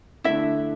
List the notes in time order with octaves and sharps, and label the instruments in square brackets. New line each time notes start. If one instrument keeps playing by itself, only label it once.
[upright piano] D3 A3 D4 [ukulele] E4 E5